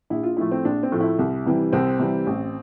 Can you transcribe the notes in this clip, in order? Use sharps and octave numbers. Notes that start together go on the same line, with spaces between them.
A#1 E4
F4
A2 F3 A3 E4
C4
A#1 D4
C4
A2 F3 A3
E4
C2
C3 E3 G3
C2 C4
C3 E3 G3
A1